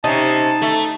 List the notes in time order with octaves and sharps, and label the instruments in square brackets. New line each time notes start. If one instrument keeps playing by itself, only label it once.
[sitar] C3 C#4 [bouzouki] D#4 [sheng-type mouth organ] A5
[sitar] A3